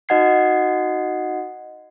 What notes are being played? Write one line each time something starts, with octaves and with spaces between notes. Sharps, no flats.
D#4 F#4 D#5 F#5 G#6 C7